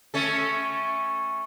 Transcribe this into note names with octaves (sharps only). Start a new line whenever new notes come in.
A3 C#4 A4